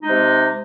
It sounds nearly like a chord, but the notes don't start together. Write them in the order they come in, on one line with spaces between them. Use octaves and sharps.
D#4 G#3 C3